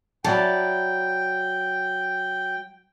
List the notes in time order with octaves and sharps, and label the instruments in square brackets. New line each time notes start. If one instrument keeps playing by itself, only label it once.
[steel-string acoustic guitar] F#3 [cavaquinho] E4 D5 A5 [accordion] G5